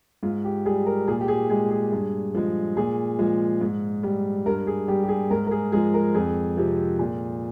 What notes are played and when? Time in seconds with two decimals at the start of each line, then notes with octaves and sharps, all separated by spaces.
0.23 G#2 F4
0.44 G4
0.66 G3 G#4
0.86 A#4
1.08 A#2 G#4
1.21 G4
1.28 G#4
1.50 G#3 G#4
1.71 G#4
1.92 G2
2.34 F3 G#3
2.77 A#2 G#4
3.19 F3 G#3
3.61 G#2
4.03 G3
4.46 G2 A#4
4.67 G#4
4.88 G3 G4
5.04 G4
5.08 G#4
5.31 G#2 A#4
5.47 A#4
5.51 G#4
5.72 F3 G#3 G#4
5.94 A#4
6.14 F2 G#4
6.57 C3 F3
6.99 A#2